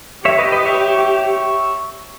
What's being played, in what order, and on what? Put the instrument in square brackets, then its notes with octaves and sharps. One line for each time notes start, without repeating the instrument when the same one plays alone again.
[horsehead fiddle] G4 [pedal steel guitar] C#5 E5
[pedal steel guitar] B4 D#5
B4 D#5
C#5 E5